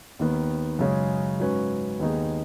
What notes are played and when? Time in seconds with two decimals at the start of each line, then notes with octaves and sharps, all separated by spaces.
0.19 D#2 D#3 B3
0.79 F#2 C#3 G#3 C#4
1.39 G#2 F#3 C#4 B4
2.00 D#2 D#3 B3 D#4 G#4